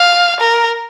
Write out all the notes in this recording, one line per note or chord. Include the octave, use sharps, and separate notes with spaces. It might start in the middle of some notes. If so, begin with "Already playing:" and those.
Already playing: F5
A#4